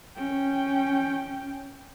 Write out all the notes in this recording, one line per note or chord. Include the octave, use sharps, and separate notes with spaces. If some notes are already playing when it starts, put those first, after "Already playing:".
C#4 G5